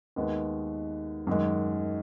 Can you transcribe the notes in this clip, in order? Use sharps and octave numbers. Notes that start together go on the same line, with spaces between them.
D#2 D#3 G#3 B3
F#2 D#3 G#3